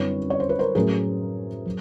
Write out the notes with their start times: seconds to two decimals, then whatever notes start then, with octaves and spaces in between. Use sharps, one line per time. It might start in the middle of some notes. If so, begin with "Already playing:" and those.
Already playing: F#2 D3 G3 C4 E4 B4 C#5
0.30 C#5
0.40 C5
0.49 B4
0.59 A#4 C5
0.75 A2 F#3 A3 C#4 G#4 A#4
1.66 F#3